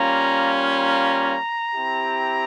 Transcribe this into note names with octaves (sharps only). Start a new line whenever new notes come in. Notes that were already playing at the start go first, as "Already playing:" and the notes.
Already playing: G3 A#3 C#4 F4 A#5
A#5
C4 E4 G4